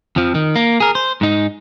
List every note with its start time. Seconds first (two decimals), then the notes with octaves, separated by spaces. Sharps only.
0.16 F2 F3
0.35 D#3
0.56 A#3
0.80 G#4 A#4
0.95 C5
1.21 G#2 D#4